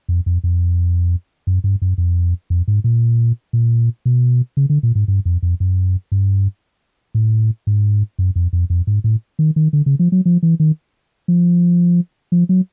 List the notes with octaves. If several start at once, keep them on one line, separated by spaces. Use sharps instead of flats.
F2
F2
F2
F#2
G2
F#2
F2
F2
G#2
A#2
A#2
B2
C#3
D3
A#2
G#2
G2
F2
F2
F#2
G2
A2
G#2
F#2
F2
F2
F2
G#2
A2
D#3
D#3
D3
C#3
F3
F#3
F3
E3
D#3
F3
F3
F#3